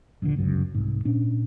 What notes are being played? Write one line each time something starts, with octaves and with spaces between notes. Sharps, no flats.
D#1 A#1 A2 D3
G1 C#2 F#2 C#3
C2 G#2
A#2 C#4 D4